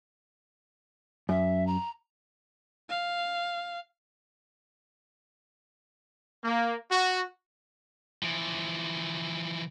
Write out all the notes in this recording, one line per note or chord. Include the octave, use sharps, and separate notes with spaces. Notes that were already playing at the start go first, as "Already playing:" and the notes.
F#2 E5
A#5
F5
A#3
F#4
E3 F3